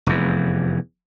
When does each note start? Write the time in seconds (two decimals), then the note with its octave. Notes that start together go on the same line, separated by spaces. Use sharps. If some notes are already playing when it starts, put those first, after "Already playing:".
0.07 F1 E2